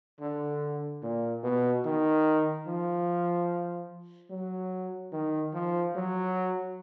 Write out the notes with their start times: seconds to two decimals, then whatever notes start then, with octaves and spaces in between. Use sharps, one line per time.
0.21 D3
1.03 A#2
1.43 B2
1.85 D#3
2.67 F3
4.30 F#3
5.12 D#3
5.54 F3
5.96 F#3